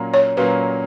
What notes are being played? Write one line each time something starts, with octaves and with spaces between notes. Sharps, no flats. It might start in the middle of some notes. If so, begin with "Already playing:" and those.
Already playing: A#2 F#3 A#3 C#4
C#5
A#2 F#3 A#3 C#4 B4